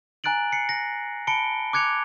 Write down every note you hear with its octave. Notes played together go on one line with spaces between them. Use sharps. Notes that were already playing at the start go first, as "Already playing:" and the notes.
G#5 A#5 F#6 A6 D7 F#7
C7 C#7
A#6
A5 B5 C#7 D7 G7
D6 F#6 G#6 C#7 F7